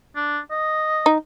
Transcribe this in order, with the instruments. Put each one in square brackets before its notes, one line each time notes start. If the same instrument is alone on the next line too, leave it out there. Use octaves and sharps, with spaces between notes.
[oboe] D4
D#5
[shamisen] D#4